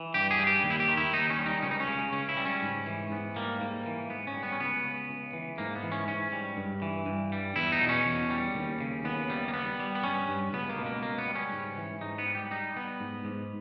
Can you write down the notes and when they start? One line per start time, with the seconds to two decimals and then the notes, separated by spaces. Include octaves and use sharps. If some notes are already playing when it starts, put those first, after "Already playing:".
Already playing: E3
0.14 G2 G4
0.31 G#4
0.39 G3
0.47 G4
0.63 D#2
0.70 E4
0.80 G4
0.88 D#3
0.97 E4
1.13 D#2 D#4
1.30 C#4
1.39 G3
1.46 D#4
1.62 C#2 C#4
1.71 D#4
1.80 C#4
1.88 C#3
2.13 C#2 C#4
2.29 E4
2.37 G3
2.45 C#4
2.62 G#2
2.86 E3
3.11 G#2 B3
3.36 G3 A#3
3.61 G#2 A#3
3.86 E3
4.10 G#2 B3
4.27 C#4
4.34 G3
4.43 B3
4.52 C#4
4.60 C#2 B3
4.85 C#3
5.09 C#2
5.33 E3
5.58 G#2 A#3
5.75 B3
5.84 E3
5.92 C#4
6.08 G#2 C#4
6.32 G3
6.57 G2
6.82 E3
7.06 G2
7.32 G3
7.56 E2 E4
7.72 D#4
7.81 B2
7.89 C#4
8.05 E2
8.30 G3
8.55 D#2
8.81 C#3
9.05 D#2 B3
9.30 G3
9.48 A#3
9.54 G3 B3
9.79 G3
9.95 B3
10.03 G2 C#4
10.29 G2
10.53 C#2 B3
10.69 A#3
10.78 B2
10.86 A#3
11.02 C#2 A#3
11.18 B3
11.27 G3
11.35 C#4
11.53 G#2
11.77 E3
12.01 G#2 D#4
12.18 B3
12.26 G3
12.35 G4
12.51 G3 D#4
12.76 G3 B3
13.00 G#2
13.25 G#2